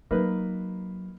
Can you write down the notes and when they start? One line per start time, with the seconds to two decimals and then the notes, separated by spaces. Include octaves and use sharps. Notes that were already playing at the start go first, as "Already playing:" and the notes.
0.11 F#3 A#3 D#4 B4